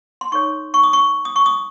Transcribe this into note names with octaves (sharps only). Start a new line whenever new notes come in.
C6
D#4 A4 C#5 C#6
C#6
D#6
C#6
D#6
C#6
D#6